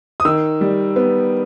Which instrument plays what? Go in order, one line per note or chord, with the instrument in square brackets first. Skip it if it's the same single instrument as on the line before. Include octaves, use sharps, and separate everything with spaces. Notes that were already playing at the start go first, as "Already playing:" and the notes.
[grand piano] D#6
D#3 E6
G3
B3